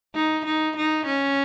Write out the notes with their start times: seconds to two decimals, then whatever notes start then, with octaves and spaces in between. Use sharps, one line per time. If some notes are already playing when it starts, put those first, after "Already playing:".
0.15 D#4
0.45 D#4
0.76 D#4
1.06 C#4